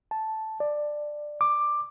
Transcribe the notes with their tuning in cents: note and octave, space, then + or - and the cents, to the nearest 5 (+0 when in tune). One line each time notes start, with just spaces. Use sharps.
A5 -5
D5 +15
D6 +10